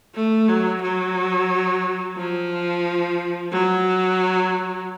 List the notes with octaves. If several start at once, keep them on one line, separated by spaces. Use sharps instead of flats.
A3
F#3
F#3
F3
F#3